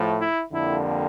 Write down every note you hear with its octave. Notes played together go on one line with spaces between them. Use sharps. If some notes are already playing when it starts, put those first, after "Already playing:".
Already playing: A2 F3 A3
E4
F2 D3 G3 A#3 E4